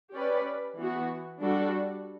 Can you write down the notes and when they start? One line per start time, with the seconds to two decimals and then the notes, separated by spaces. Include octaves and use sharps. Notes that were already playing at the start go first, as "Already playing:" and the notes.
0.13 C#4 G4 B4 D5
0.77 E3 B3 F#4
1.41 G3 D4 F#4 A4